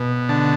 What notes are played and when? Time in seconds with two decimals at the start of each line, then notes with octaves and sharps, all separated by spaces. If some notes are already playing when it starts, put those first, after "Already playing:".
Already playing: B2
0.29 D3 A5